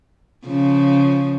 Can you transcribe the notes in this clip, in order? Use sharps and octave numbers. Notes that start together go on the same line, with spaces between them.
C#3 F3